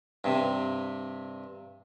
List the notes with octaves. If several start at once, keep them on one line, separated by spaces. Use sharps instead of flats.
G2 C3